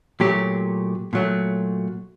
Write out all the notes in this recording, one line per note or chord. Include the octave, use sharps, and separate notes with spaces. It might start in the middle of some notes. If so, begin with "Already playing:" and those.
A#2 F#3 A3 G4
A#2 F#3 A3